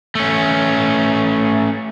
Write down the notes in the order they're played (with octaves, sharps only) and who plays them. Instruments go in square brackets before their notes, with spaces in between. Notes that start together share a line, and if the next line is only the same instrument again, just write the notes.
[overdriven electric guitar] A3 C#4